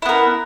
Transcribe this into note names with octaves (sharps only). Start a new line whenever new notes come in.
B3 E4 A#4